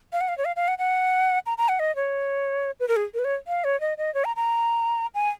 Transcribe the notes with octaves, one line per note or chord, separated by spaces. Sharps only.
F5
F#5
F5
C#5
F5
F5
F#5
F#5
A#5
A#5
F#5
D#5
C#5
B4
A#4
G#4
A#4
B4
C#5
F5
C#5
D#5
D#5
C#5
A#5
A#5
G#5